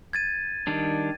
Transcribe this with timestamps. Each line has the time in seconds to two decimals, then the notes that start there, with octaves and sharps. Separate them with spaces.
0.13 G#6 A6 D#7
0.67 D#3 G3 D4